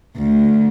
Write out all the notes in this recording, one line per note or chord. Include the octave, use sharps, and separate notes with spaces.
D2